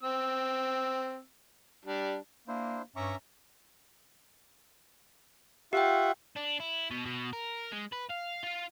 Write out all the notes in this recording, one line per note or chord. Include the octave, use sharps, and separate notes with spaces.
C4 E6
G3 D4
A#3 D4 E4 C5
G2 C#4 E5 A#5 C#6 D6
F4 G4 E5 F#5 G5
D4
E4
B2
B2
A#4
G#3
B4
F5
F4